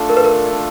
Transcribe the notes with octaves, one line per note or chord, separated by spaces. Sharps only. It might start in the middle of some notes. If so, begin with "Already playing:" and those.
Already playing: A3 D4 F4 A4
A#4
B4
A#4